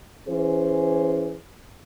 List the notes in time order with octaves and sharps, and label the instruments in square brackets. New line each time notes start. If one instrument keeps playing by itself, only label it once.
[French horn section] E3 C#4 G#4 C5